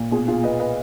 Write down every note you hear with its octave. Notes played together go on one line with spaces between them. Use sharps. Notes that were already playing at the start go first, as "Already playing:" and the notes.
Already playing: A#2
B2 F4 G#4
F4 G#4
B2 B4 D#5
B4 D#5